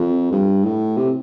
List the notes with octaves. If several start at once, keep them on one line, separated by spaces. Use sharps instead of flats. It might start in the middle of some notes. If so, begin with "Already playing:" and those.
Already playing: F2
G2
A2
C3